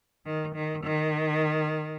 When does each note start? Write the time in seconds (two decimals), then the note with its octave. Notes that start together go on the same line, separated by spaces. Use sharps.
0.25 D#3
0.54 D#3
0.83 D#3